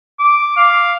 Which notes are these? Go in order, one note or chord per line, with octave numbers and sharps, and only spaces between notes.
D6
F5